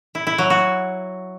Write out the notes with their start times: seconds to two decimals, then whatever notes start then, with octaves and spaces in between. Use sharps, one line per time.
0.15 E4
0.27 E4
0.38 F#3
0.50 F#4